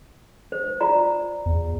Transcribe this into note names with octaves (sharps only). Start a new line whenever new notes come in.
C5
F4 D5 A#5
E2